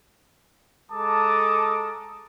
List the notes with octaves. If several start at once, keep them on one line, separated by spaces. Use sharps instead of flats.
G#3 A4 A5 A#5 D6 D#6